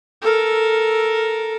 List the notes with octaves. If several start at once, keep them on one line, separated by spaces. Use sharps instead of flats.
A4 A#4